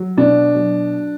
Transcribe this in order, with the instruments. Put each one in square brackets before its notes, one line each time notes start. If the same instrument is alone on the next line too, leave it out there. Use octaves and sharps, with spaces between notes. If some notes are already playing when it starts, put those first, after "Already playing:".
Already playing: [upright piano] F#3
[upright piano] B2 [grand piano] D4
[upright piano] F#3